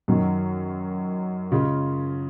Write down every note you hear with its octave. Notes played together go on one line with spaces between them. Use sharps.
F#2 D#3 F#3 C#4
C#3 G#3 C#4 F4